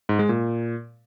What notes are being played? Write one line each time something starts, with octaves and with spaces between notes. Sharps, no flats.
G#2
G#3
A#2